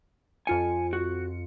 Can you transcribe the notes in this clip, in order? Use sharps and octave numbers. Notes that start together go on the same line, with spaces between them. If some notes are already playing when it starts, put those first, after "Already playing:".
F2 F4 G#5 C#7
F#4